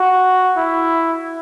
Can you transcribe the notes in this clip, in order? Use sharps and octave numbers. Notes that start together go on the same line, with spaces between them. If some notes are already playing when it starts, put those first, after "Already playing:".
Already playing: F#4
E4